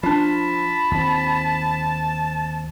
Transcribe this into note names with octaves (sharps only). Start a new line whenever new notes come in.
F3 D4 F4 A5 B5
D#2 C4